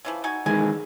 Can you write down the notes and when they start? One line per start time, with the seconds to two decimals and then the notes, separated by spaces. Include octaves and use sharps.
0.05 C#3 E3 F3
0.24 D#4 F#4 G#5
0.46 D#3 E3 G#3 G#5